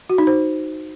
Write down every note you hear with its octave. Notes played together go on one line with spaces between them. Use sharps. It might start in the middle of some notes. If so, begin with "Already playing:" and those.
F#4
D#4
C5